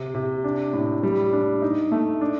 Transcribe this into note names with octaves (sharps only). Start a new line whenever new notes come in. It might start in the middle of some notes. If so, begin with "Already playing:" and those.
Already playing: C3
C3
D4
A2
G3
D4
D#4
A3
D4